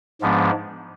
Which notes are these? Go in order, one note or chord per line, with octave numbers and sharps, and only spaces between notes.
G#2 F3 G#3 B3 D4